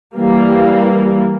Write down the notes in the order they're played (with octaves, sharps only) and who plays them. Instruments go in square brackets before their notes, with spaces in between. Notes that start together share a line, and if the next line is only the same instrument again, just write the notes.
[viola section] E3 G3 A#3